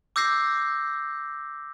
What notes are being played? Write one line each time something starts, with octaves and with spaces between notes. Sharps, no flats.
D6 E6 G6 A#6 C7